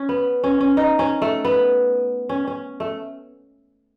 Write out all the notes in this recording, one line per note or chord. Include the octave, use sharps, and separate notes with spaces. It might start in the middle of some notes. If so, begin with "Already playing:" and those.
Already playing: C#4
B3
C#4
C#4
D#4
C#4
A3
B3
C#4
C#4
A3